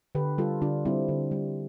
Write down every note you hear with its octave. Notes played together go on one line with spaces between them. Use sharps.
D3 G4 B4
G3 F4 A4
D3 D4 F4
G3 C4 E4
D3
G3